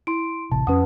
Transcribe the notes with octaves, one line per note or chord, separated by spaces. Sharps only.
E4 C6 D7
A1 C3 A5
F2 E3 F3 C#4 B4 F#5 D#6